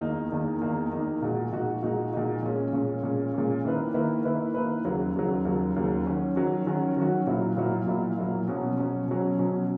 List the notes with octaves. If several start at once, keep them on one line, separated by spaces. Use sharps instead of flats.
E2 D#3 A#3 D#4
E2 D#3 A#3 D#4
E2 D#3 A#3 D#4
E2 D#3 A#3 D#4
A#2 G#3 D#4 F#4
A#2 G#3 D#4 F#4
A#2 G#3 D#4 F#4
A#2 G#3 D#4 F#4
A#2 G#3 C#4
A#2 G#3 C#4
A#2 G#3 C#4
A#2 G#3 C#4
D#3 A#3 E4 B4
D#3 A#3 E4 B4
D#3 A#3 E4 B4
D#3 A#3 E4 B4
D#2 C#3 F#3
D#2 C#3 F#3
D#2 C#3 F#3
D#2 C#3 F#3
D#3 F#3 C#4 F#4
D#3 F#3 C#4 F#4
D#3 F#3 C#4 F#4
D#3 F#3 C#4 F#4
A#2 F#3 A#3 E4
A#2 F#3 A#3 E4
A#2 F#3 A#3 E4
A#2 F#3 A#3 E4
B2 F#3 C#4
B2 F#3 C#4
B2 F#3 C#4
B2 F#3 C#4